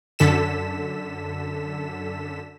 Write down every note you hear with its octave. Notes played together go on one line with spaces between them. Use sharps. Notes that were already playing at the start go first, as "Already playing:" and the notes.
F#2 D3 A4 B6 E7